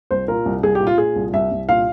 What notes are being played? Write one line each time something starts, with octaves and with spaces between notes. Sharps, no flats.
C2 C5
A#2 A#4
C2
C2 G#4
G4
A#2
F4
A#2 G#4
C2
C2 E5
C2
A#2 F5